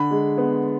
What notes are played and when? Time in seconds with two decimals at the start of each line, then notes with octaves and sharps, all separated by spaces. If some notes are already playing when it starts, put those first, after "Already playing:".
Already playing: D3 B5
0.11 G#3
0.38 B3